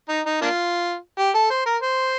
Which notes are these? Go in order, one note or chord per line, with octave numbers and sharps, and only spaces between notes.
D#4
D#4
A#3 D4 F4
G4
A4
C5
A#4
C5